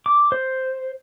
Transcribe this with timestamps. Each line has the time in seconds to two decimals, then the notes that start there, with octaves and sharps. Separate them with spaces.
0.06 D6
0.32 C5